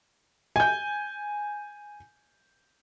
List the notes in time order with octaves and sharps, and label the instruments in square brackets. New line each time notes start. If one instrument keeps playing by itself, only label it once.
[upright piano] G#5 G6